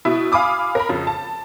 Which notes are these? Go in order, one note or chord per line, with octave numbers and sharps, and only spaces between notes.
B2 E4
F5 G#5 B5 D6 D#6
A#4 B5
F2 C#3
A5